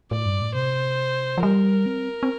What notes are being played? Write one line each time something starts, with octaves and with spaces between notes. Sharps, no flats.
A2 D5
G2
A2
C3 C5
F3
G3 A#4
C4
C4